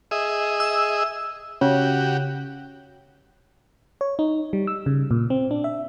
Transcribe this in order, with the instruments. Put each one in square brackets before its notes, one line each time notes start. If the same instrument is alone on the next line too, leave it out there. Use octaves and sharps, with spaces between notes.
[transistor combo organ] G#4 D#5 E5
[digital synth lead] E6
[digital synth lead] C#3 [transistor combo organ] F#4 G4
[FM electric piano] C#5
D#4
G3
E6
C#3
A#2
C4
D4
E5